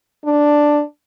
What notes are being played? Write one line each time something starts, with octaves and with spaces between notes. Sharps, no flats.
D4